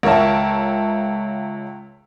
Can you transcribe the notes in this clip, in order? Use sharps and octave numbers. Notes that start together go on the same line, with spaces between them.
C#2 A#4 C#5 E5 A5